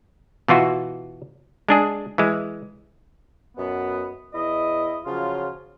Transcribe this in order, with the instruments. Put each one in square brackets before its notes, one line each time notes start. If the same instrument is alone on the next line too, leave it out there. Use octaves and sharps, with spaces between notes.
[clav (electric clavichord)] B2 E3 F4 F#4
G#3 D4 G#4
E3 G#3
[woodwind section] F#2 B2 F#3 B3
E2 E4 D#5
C#3 F3 F#3 F4